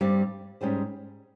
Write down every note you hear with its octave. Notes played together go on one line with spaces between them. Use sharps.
G2 G3 C4
G#2 G3 C#4 G#4 C5